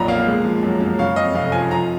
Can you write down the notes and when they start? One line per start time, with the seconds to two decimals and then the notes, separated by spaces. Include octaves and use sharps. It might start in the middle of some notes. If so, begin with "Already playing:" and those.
Already playing: B1 F2 A#2 F3 A#5 B5
0.08 A#3 F5
0.26 G#3
0.44 F3
0.63 F#2
0.80 F#2
0.98 C#3 F5
1.16 F2 D#5
1.34 F1 F5
1.52 F3 G#5
1.70 F3 A#5